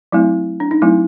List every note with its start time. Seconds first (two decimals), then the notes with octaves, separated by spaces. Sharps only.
0.12 F#3 A3 C4 E4
0.60 D4
0.71 D#4
0.82 F#3 A3 C4 E4